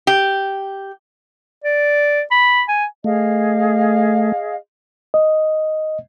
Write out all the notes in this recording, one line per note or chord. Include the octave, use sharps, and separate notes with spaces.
G4
D5
B5
G#5
A3 G#4 D#5 F5
D#5